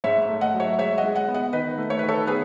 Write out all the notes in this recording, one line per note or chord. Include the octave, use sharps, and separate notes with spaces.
G#2 C#5 E5
A3
D#5 F#5
F#3
C#5 E5
G#3 C#5 E5
D#5 F#5
G#3
D#5 F#5
B3
D#5 F#5
D#3 B4 D#5
A3
C#5
D#3 B4
A4 C#5
B3 G#4 B4